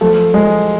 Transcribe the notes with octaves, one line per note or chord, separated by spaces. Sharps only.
F3 A3 A4
F3 G#3 G#4